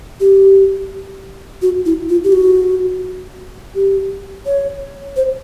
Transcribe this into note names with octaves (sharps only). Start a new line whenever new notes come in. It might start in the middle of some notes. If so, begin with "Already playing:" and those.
G4
F#4
E4
F4
G4
F#4
G4
C#5
C5